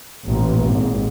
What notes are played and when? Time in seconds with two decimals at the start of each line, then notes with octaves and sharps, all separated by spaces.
0.25 A1 A#2
0.65 G#1